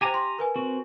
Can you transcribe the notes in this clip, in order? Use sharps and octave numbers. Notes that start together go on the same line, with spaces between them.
G4 C5 G5 G#5 A#5 D6
C6
A#4 B4 G#5
C4 F#4